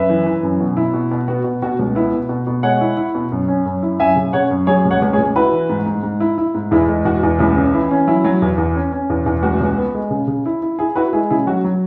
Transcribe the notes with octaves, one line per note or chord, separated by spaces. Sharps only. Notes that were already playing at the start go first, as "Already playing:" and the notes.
Already playing: F#2 B4 E5
E3
E3
F#2
B2
E4
B2
B2
B3 F#4
B2
B2 F#4
C#2
B3 E4
B2
B2
B2
G#3 C#5 F#5
E4
E4
B2
F#2
C#4
F#2
E4
F#2 E5 G#5
C#3
C#3 C#5 F#5
F#2
F#3 G#4 C#5
C#2
C#5 F#5
C#2
G#4 C#5
C#2
E4 F#4 B4
E3
G#2
G#2
G#2
E4
E4
G#2
E2 E4 G#4
G#3
E2 F#4
E2
C#2 E4
C#3
E3 E4
C#4
F#3 E4
F#3
E2
E2
C#4
C#4
E2
E2
C#2 F#4
C#2
B3
G#3
C#3
C#3
E4
E4
E4 G#4
E4 F#4 B4
G#3 E4 G#4
C#3 E4 G#4
F#3 F#4
F#3